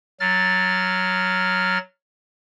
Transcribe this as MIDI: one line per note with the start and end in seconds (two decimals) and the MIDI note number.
0.20 1.78 54
0.20 1.78 89
0.20 1.78 93